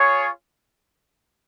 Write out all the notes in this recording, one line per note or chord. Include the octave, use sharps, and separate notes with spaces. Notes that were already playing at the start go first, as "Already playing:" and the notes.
Already playing: F4 G#4 C#5